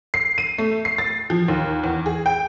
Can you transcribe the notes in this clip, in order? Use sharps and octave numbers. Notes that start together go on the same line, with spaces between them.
C7
D#7
A3
C7
A6
F3
D#2
E2
G#4
G5